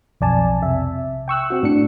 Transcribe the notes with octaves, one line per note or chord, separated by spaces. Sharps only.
B1 F2 D5 G#5 A5
C3 E5
G5 C#6 E6 F#6
C4 F#4
A2 D4 C#7